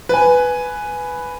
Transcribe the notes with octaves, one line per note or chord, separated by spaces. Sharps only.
B4 G#5